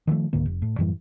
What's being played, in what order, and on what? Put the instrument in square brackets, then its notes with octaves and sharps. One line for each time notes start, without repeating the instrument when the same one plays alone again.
[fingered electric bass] D#3 F3 F#3 A3
C#2 G#2 D3 A#3
F1
A2
F#2 A2 E3 G3